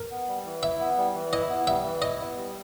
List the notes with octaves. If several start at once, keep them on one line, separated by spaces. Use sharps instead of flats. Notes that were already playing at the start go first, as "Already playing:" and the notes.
Already playing: A#4
B3
G3
E3
E4 E5
B3
G3
E3
E4 D#5
B3
G3 E5
E3
E4 D#5
B3
G3